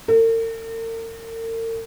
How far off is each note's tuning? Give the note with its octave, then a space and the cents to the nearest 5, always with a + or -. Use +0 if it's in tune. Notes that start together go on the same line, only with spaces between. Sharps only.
A#4 -45